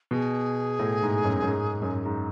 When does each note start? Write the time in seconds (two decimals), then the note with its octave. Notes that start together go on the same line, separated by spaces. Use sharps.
0.11 B2 G#4
0.79 A2
1.02 G#2
1.24 F#2
1.42 F#2
1.48 G#2
1.82 F#2
2.05 G#2